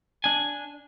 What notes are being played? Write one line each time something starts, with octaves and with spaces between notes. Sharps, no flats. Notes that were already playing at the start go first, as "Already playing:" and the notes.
D4 G#5